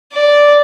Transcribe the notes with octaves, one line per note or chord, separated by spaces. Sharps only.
D5